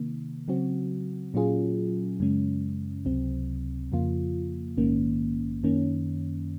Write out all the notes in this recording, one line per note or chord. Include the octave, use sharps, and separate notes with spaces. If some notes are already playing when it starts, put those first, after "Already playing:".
Already playing: C3 D#3 A#3
C#3 F#3 C4 F#4
A#2 F#3 C#4 F4 G#4
F#2 C#3 G#3 C#4
C#2 C3 F#3 C4
F2 C#3 F3 A#3 F4
A#1 G#2 D#3 A#3 C#4
F#2 D#3 A#3 C#4